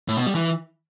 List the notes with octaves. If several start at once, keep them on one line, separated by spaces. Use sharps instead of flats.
A2
B2
G3
E3